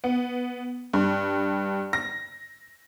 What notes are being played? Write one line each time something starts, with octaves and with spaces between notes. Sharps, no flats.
B3
G2
A#6